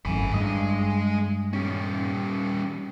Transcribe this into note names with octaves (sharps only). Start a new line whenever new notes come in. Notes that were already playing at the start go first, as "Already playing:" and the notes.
G#1 F#2 A2 G#5 B5
G2 G#3 D#5
G3 C#4